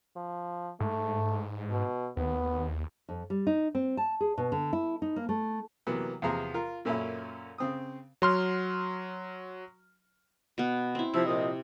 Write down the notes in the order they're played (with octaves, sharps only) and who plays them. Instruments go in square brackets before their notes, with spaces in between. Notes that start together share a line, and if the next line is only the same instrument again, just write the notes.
[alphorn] F3
[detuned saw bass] G#2 [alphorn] A3
[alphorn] B2
[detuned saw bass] D#2 [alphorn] B3
[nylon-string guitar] F2
G3
D#4
C4
A5
G#4
B2
D3
E4
D#4
A#3
A3
[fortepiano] C3 E3 F#3 A#3 B3
E2 C3 F3 G#4 A#5 C6
F4 A#4
F#2 A#2 C#4 A4 E5 B5
C#3 C4 D#6
[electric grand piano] F#3 C6 F6
[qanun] B2 B3
C4 E4
[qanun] C3 [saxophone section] F3 E4
[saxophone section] A#2 F3 D#5